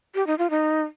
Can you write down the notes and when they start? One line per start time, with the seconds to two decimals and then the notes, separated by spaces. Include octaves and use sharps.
0.15 G4
0.27 D#4
0.39 F4
0.50 D#4